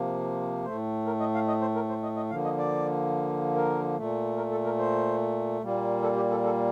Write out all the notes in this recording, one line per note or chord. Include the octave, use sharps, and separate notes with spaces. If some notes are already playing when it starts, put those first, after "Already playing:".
Already playing: C3 F3 A#3
A2 A3 C5
A#4
D#5
F5
D#5
C5
A#4
C5
D#5
D#5
D3 F3 A#3 F5
D#5
D5
A#4
A#2 A3
A#4
A4
A#4
C5
A#2 G3 A#3
A4
G4
A4
A4